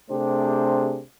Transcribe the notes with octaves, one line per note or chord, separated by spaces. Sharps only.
C3 A3 D4 G4 G#4 C5